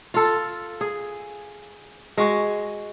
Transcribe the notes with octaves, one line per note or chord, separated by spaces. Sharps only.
F4 A4
G#4
G#3 F#4